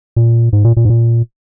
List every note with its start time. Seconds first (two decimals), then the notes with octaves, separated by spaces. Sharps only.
0.16 A#2
0.53 G#2
0.64 A#2
0.77 A#2
0.85 G#2
0.90 A#2